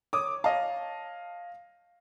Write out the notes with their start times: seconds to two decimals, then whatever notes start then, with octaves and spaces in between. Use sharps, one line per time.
0.13 C#5 D6 D#6
0.44 C#5 D#5 F5 A5